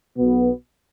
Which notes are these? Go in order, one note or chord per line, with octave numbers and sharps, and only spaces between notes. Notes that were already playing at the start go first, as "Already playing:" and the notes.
B1 B2 B3